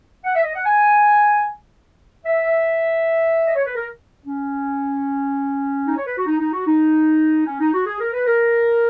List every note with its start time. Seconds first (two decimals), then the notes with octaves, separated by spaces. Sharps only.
0.24 F#5
0.35 E5
0.45 D#5
0.55 F#5
0.65 G#5
2.25 E5
3.46 D#5
3.56 C#5
3.66 B4
3.76 A#4
4.26 C#4
5.87 D#4
5.97 C#5
6.06 B4
6.17 F#4
6.26 D#4
6.40 D#4
6.53 F#4
6.67 D#4
7.47 C#4
7.60 D#4
7.74 F#4
7.86 G#4
8.00 A#4
8.13 B4
8.26 A#4